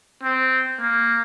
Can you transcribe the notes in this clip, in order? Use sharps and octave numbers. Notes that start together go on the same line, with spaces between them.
C4
A#3